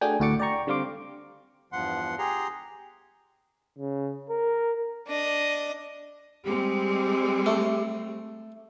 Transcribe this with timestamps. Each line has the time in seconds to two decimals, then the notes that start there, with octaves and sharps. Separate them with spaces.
0.01 A3 D4 F#4 G#4 G5 G#5
0.20 D2 A2 F#4 D5 D6 C#7
0.40 D5 G5 A#5 C#6
0.67 D3 G3 C4 F5 C6 D6
1.73 E2 G2 F3 F#5 C6
2.19 G4 G#4 A#5 C6
3.79 C#3
4.30 A#4
5.07 D4 D#5
6.45 G3 G#3 C4 G4
7.46 A3